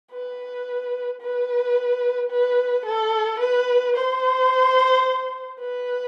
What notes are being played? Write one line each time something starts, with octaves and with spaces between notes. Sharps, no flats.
B4
B4
B4
A4
B4
C5
B4